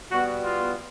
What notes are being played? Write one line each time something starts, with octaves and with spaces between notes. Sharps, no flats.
B2 G3 B3 F#4
F4